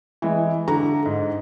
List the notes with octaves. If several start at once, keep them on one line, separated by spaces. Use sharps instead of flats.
E3 G#3
D3 A#5
G#2